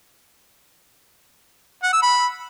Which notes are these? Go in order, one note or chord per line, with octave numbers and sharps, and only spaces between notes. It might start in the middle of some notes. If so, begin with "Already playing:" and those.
F#5
E6
B5